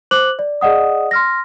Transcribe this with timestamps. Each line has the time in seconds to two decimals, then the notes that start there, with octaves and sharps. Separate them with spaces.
0.11 C5 D6 F#6 F#7
0.39 D5
0.61 G#4 D5 D#5 F#5 D#6
1.11 C6 F6 A#6